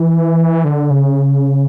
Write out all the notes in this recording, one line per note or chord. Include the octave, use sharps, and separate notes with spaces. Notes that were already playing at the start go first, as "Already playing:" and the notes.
Already playing: E3
D3
C#3